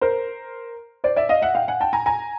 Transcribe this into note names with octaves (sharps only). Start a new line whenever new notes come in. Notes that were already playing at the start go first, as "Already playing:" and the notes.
A#4 C5
C5 D5
D5 E5
D#5 F5
E5 F#5
F5 G5
F#5 G#5
G5 A5
G#5 A#5
G#5 A#5